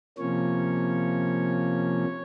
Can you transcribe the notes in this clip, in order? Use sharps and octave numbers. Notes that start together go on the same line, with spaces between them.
C3 F3 A#3 C#4 C#5